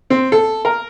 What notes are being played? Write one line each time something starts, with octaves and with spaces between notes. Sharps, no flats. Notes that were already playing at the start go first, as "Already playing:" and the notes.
C4
A4
A#4